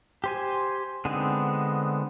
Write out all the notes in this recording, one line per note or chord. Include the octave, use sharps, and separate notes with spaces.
G4 C5 G#5
D3 G#3 B3 C4 D#4